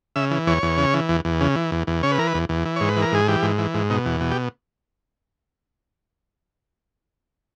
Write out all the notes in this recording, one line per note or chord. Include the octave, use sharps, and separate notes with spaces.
C#3 E5
E3
E2 C#5
E2
C#3
E3
E2
E2
C#3
E3
E2
E2
C#3 C#5
B4
E3 A#4
B4
E2
E2
E3
G#2 C#5
B4
E3
A#4
G#2 G#4
E3 G4
G#2
E3
G#2
B2 D#4
E2
B2
G4